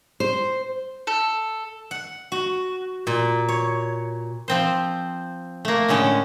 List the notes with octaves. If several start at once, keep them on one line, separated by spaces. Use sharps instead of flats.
C5
A4
F#5
F#4
A#2
C#5
F3 C4 C5
A3 A#3
A2 D3 G#3 C#4